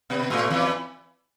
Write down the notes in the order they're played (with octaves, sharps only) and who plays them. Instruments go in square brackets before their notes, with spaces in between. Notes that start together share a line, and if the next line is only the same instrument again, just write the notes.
[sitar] B2 B3
A2 A3
E2 E3